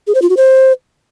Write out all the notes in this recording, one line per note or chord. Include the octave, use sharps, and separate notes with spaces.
G#4
C5
F4
F#4
C5